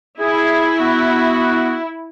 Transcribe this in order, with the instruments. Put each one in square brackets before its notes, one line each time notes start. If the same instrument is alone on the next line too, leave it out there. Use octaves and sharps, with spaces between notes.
[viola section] E4 [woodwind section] G#4
[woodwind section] B3 F#4